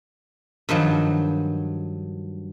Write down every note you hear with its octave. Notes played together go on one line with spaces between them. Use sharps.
G2 D#3 F3 F#3